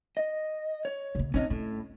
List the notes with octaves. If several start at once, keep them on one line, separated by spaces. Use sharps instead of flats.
D#5
C#5
C#3 A#3
C4 C#4 D#4 C#5 D#5
A2 C#4